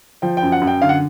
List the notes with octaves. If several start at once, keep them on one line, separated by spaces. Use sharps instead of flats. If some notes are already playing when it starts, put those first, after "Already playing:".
F3 G5
G5
F#2
F#5
F#2
G5
D3 F5
F#5